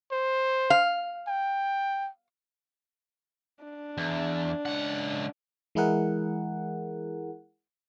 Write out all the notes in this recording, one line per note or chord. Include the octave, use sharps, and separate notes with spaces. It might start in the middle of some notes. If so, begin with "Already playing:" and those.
C5
F5
G5
D4
E2
C#2 F#5
E3 G#3 E4 G#4 A#4 F#5